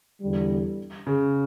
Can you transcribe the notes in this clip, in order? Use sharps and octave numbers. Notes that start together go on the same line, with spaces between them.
E2 D3 G3
C#3